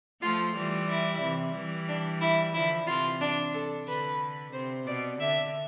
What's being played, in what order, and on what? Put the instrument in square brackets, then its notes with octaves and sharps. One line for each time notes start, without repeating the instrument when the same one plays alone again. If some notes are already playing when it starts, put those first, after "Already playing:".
[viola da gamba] F3 A3 [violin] F4
[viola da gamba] E3 G3
[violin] E4
[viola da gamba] C3 E3
E3 G3
[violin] D4
E4
[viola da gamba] D3 F3 [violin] E4
[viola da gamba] C3 E3 [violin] F4
[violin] D4
A4
[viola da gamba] D3 [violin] B4
[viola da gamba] C3 [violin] C5
[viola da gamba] B2 [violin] D5
[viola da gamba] D3 [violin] E5